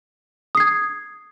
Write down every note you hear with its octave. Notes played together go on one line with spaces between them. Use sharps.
D#6 G#6 C7